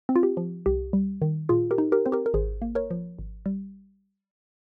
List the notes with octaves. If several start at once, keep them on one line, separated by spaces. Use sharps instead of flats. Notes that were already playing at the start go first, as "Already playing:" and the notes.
C4
F4
G4
F3
C2 G4
G3
D#3
A#2 F4 G#4
G4 A#4
D#4
G4 A#4
C4 C5
G4 A#4
A#4
G#1 G#4 C5
A#3
A#4 C#5
F3
G#1
G3